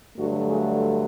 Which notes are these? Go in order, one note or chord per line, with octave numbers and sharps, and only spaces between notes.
G2 D3 F#3 A3 F#4
G#4